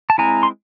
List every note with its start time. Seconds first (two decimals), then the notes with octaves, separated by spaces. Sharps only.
0.10 A5
0.18 G#3 C4 E4 G#5 A#5
0.43 C6